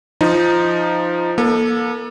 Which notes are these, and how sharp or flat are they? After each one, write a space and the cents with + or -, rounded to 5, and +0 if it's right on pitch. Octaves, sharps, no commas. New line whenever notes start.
F3 -10 D#4 +0
A#3 +35 A4 +5